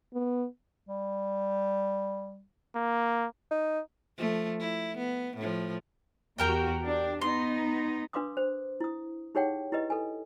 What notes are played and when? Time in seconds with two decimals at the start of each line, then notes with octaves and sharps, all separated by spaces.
0.13 B3
0.89 G3
2.75 A#3
3.51 D#4
4.18 F3 A3
4.60 E4
4.97 B3
5.37 A2 F3
6.38 E2 F#4 G4 A#4 G5
6.86 D4
7.21 B3 D#4 C6
8.13 D4 B4 F5 C6 D6 D#6
8.37 C5
8.80 E4 D#6
9.35 D#4 G4 G#4 C#5 F#5 G5
9.72 E4 G4 B4 D#5
9.90 A4 B4 G#5